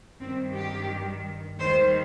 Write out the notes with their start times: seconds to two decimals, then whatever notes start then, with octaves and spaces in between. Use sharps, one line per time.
0.20 G2 D#3 G3 C4
0.55 G4
1.60 D#2 D#3 G3 C5